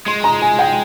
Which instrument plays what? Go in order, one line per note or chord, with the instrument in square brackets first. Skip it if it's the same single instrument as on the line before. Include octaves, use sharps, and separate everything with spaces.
[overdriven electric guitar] G#3 [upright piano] C6
[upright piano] A#5
G#5
G5